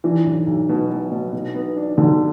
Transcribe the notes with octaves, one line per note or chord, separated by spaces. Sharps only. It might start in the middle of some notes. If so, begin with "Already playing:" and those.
E3 D4
B1
B1
B2
B2
B2
B2
B3
D4
B1 D3